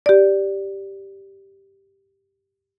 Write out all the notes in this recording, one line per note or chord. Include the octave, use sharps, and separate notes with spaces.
G4 D5